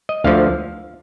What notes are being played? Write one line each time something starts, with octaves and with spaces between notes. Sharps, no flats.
D#5
D2 D3 F3 F5